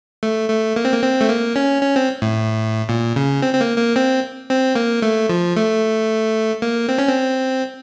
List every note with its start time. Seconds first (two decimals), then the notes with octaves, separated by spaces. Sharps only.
0.23 A3
0.50 A3
0.76 A#3
0.85 C4
0.93 A#3
1.02 C4
1.21 A3
1.29 A#3
1.56 C#4
1.82 C#4
1.96 C4
2.22 A2
2.89 A#2
3.16 C#3
3.42 C4
3.54 C4
3.61 A#3
3.78 A#3
3.96 C4
4.49 C4
4.75 A#3
5.02 A3
5.29 F3
5.56 A3
6.62 A#3
6.89 C4
6.99 C#4
7.08 C4